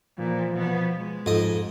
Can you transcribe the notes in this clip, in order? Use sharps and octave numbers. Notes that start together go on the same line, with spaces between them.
A#2 E3 F3
B2 B3
G#3
F2 G#2 D#5